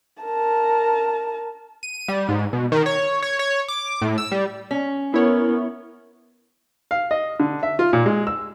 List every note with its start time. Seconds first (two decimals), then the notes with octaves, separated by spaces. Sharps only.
0.23 A#4 A5
1.83 D#7
2.08 G3
2.29 G#2
2.53 B2
2.72 D#3
2.86 C#5
3.22 C#5
3.39 C#5
3.68 D6
4.02 A2
4.18 E6
4.32 G3
4.71 C#4
5.14 B3 E4 A#4 C#5
6.91 F5
7.11 D#5
7.40 D3
7.63 E5
7.79 F4
7.93 A#2
8.06 G#3
8.27 E6